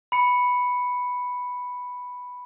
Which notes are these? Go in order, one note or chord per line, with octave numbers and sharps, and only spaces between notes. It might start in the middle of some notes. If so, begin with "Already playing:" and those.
B5 C#7